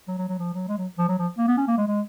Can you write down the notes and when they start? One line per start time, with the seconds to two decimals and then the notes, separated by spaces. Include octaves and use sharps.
0.08 F#3
0.18 F#3
0.29 F#3
0.39 F3
0.54 F#3
0.68 G#3
0.78 F#3
0.98 F3
1.08 F#3
1.18 F3
1.38 A#3
1.47 B3
1.57 C#4
1.68 A#3
1.78 G#3
1.88 G#3